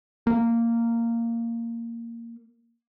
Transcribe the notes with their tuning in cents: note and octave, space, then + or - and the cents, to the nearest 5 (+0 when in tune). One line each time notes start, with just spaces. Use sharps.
A#3 -10